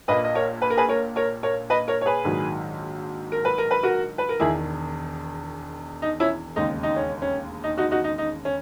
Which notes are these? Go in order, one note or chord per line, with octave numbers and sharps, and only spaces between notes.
A#1 A#2 A#3 B4 D#5
D#5
A#4 C#5
B4
A#4
G#4 B4
A#4 C#5
A#4 C#5
A#4 C#5
B4 D#5
A#4 C#5
C#5
G#4 B4
A#1 G#2 D#3 F#3
A#4
B4
A#4
B4
F#4 A#4
B4
A#4
E1 E2 D#3 E4 G#4
D#4
C#4 E4
E1 D#2 C#3 G#3 D#4
D#4
C#4
C#4
D#4
D#4 F#4
D#4 F#4
D#4
D#4
C#4